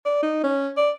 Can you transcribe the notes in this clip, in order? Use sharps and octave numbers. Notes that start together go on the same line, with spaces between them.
D5
D#4
C#4
D5